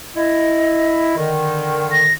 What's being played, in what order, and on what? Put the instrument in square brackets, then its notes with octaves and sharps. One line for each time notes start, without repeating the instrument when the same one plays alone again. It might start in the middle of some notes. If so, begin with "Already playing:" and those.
[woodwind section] E4 [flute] D#5
[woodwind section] D3 D#3
[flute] A#6